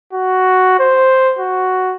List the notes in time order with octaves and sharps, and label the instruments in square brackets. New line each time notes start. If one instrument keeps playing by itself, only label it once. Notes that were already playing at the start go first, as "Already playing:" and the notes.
[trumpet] F#4
C5
F#4